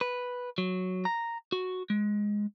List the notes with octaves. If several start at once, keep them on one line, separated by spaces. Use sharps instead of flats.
B4
F#3
A#5
F#4
G#3